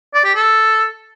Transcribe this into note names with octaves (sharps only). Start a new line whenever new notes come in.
D5
G4
A4